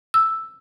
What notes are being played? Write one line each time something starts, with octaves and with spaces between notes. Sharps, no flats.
E6